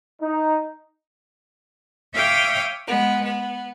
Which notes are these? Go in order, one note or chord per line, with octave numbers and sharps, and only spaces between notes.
D#4
C#5 E5 F5 G5 D6 D#6
G#3 B3
B3